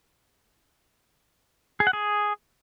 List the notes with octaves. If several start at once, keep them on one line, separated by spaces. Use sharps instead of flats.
G#4
F#5
G#4